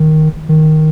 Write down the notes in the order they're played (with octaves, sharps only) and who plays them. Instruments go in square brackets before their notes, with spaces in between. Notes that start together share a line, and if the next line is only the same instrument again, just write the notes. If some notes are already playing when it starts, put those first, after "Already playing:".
Already playing: [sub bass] D#3
D#3